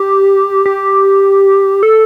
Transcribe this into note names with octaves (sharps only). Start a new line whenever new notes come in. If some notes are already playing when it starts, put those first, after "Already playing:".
Already playing: G4
G4
A4